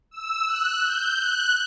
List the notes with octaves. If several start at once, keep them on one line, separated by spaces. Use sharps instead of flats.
E6
F#6
G6
F#6